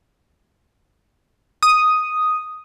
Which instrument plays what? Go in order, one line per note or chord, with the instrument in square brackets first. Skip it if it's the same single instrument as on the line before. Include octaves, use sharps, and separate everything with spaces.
[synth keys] D#6